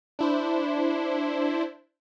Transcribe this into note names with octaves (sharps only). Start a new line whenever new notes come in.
D4 E4 C5